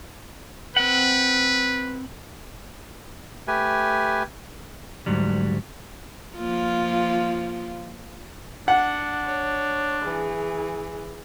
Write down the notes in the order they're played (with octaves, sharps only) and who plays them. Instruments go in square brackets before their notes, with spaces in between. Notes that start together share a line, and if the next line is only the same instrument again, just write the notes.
[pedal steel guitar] C4 F#5 [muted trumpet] B4
[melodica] A3 G4 B4 G#5
[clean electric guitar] D2 G#2 F#3 G3
[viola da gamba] F3 A#3 F4
[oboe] D4 [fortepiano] F#5
[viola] C#5
E3 G#4